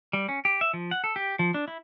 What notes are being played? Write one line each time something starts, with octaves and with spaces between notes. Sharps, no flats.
G3
C#4
G4
E5
F3
F#5
A4
G4
F3
D4
E4